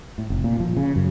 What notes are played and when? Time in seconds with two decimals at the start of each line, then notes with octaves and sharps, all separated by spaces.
0.18 A2
0.30 F1
0.44 A#2
0.60 F3
0.77 C#3
0.96 F#2